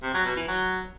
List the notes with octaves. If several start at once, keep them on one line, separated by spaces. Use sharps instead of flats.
C3
F#3
B2
E3
F#3